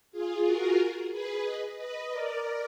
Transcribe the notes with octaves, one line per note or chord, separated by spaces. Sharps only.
F4 G#4
F#4 A#4
G#4 B4
B4 D#5
B4 D#5
A#4 D5